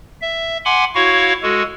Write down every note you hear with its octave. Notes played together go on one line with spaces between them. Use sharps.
E5
F#5 G#5 B5 C6 D6
E4 F#4 C#5 F5 C#6
G#3 F#4 A4